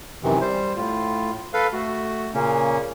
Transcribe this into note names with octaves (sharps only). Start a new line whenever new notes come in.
F#2 C3 D#3 E3
G3 C5
A2 F4
A4 B4 F5
A3 F#4
A#2 C#3 A#3 C#4